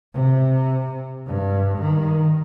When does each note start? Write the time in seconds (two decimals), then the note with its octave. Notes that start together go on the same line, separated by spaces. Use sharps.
0.14 C3
1.27 G2
1.79 D#3